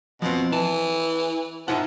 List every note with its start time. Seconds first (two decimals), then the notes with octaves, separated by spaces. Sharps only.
0.22 B2 F3 C4
0.52 E3 A5
1.68 F3 D#4 E4 F#5